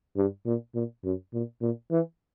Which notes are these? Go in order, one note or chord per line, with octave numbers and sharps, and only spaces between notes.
G2
A#2
A#2
F#2
A#2
A#2
E3